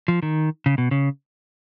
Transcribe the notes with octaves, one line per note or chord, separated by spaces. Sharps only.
F3
D#3
C#3
B2
C#3